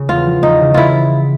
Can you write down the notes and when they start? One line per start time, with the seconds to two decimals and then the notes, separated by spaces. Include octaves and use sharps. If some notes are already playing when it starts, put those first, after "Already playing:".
Already playing: C#3
0.09 E2 F4
0.26 F3
0.43 E2 D#4
0.61 C#3
0.74 E4 F4